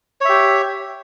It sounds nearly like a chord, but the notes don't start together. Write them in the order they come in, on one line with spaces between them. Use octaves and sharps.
C#5 E5 G4